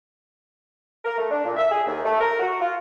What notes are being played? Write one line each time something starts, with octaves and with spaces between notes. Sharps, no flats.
A#4
A3
D4
A#2
E5
G#4
D#2
A3
A#4
F#4
F4